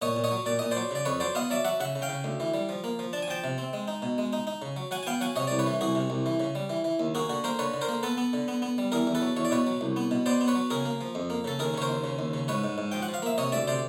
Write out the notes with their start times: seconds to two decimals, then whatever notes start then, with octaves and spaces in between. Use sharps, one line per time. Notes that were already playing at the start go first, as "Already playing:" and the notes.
0.02 A#2 C#5 D#5
0.16 A#2
0.24 C#5 D#5
0.32 F#3
0.46 A#2 D5
0.59 A#2 D#5
0.71 C5 D5
0.77 F#3
0.91 C#3 D5
1.05 F2 B4 C#5
1.20 F#3 C5 D5
1.35 B3 D#5 F5
1.50 F#3 D5 E5
1.65 F#3 E5 F#5
1.80 C#3 E5 F#5
1.95 C#3
2.02 F5 G5
2.09 C#3
2.24 D2
2.40 E3
2.54 G3
2.69 F3
2.84 A#3
2.99 F3
3.13 D4 A5
3.22 G#5
3.28 F3 G5 A5
3.44 C3
3.58 C4
3.73 G#3
3.88 D#4
4.02 B2
4.18 G#3
4.33 D#4
4.47 D#4
4.62 C#3
4.76 F#3
4.91 F#3 F#5 G#5
5.03 G#5
5.07 B3 F5 G5
5.21 F#3 F#5 G#5
5.36 C3 C#5 D#5
5.47 C2 D5
5.59 B4 C#5
5.66 E3
5.81 C2 F#4 G#4
5.95 C3
6.10 C2
6.26 E3
6.40 C#3
6.55 G3
6.70 E3
6.84 E3
7.00 D#2
7.15 A#3 F#4 G#4
7.29 D3 F#4
7.44 A#3 A#4 C5
7.59 D3 B4 C#5
7.74 D3
7.81 A#4 C5
7.89 A#3
8.03 B3 A4 B4
8.18 B3
8.33 D3
8.48 B3
8.62 B3
8.78 G3
8.92 E2 G#4 A#4
9.07 E2
9.15 A4 B4
9.22 F#3
9.37 E2 C#5
9.45 D5
9.51 B2 B4 C#5
9.67 F#3
9.81 C2
9.96 B3
10.11 B2
10.26 B3 C5 D5
10.41 B3
10.48 B4 C#5
10.55 F#3
10.70 C#3 G#4 A#4
10.85 A#3
11.01 F3
11.15 F2
11.30 A#3
11.44 C#3 A4
11.59 D#2 G#4 A#4
11.74 C#3 C#5
11.82 A#4 C5
11.89 D#2
12.04 C#3
12.19 D#2
12.33 C#3
12.48 G#2 B4 C#5
12.64 G#2
12.78 G#2
12.92 F3 G5
13.02 F#5
13.09 F3
13.14 F5
13.22 A#3 E5
13.38 C3 C#5 D#5
13.52 D2 D5 E5
13.67 C3 C5 D5